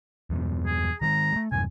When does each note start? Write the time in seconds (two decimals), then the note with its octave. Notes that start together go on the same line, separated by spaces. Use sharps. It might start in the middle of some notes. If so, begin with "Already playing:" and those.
0.30 E2 G2 B2
0.66 G#4
1.02 D#3 G3 G#3 A#5
1.32 G#3 A3
1.52 E2 G2 C3 G#5